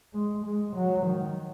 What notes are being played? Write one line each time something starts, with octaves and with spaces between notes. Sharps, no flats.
G#3
G#3
F#3
D#3